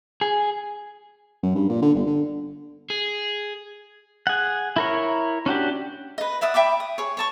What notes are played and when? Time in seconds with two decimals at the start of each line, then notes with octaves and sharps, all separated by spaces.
0.21 G#4
1.43 F#2
1.55 G2
1.69 A#2
1.82 D3
1.95 G1
2.06 D3
2.90 G#4
4.27 G#4 F#5
4.76 E4 A#4 C#5
5.46 C#4 D4 F#4 G4
6.18 B4 D#5
6.41 D5 E5 F#5 D#6
6.54 E5 G5 B5 D6
6.80 D#6
6.98 G#4 C#5
7.17 C#5 A5 C#6